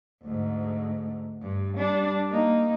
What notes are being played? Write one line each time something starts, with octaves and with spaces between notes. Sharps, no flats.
D2 G#2
G2
G3 D4
A#3 D#4